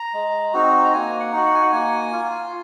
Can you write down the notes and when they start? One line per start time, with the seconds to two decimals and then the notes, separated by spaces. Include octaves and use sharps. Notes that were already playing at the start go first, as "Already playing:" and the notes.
Already playing: A#5
0.14 G#3
0.53 C4 D#4 F#4
0.85 A#5
0.93 A#3 G#5
1.20 F#5
1.32 D#4 F#4
1.46 F#5
1.54 G#5
1.62 F#5
1.72 A#3 G#5
2.12 F4